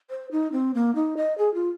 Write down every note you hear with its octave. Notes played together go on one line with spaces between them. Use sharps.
C5
D#4
C4
A#3
D#4
D#5
G#4
F4